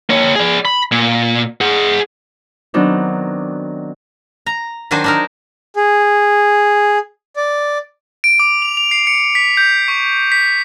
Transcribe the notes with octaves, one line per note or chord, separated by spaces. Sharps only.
A#3 C#5
G#4 D5
B5
A#2
G#4 F#5
D#3 F#3 B3 C4 D4 D#4
A#5
D#3 F#3 D4 C5 G#5
D4 D#4 A#4
G#4
D5
D7
D6
F7
F7
C7
C#7
B6
G6
C#6
B6